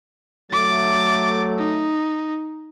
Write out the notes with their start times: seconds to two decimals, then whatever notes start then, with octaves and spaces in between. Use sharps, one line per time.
0.52 F#3 A3 D6 A6
1.57 D#4